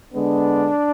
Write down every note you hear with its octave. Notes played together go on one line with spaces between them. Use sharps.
D3 G#3 B3 D4